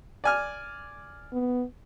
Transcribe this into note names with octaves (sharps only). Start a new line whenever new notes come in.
D5 G#5 F6
B3